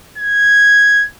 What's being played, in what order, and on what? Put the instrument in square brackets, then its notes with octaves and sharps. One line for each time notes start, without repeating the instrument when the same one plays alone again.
[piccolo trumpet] G#6